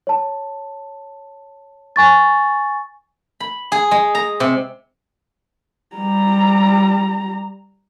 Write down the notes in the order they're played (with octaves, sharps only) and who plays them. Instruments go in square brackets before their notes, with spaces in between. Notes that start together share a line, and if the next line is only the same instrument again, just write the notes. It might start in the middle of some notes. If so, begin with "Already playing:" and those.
[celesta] C#5 A5
G#5 C#6 A6
[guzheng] B5
G#4
G#3
A#5
C3
[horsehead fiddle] G3 A#5